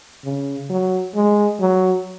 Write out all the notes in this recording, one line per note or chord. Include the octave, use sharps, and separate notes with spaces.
C#3
F#3
G#3
F#3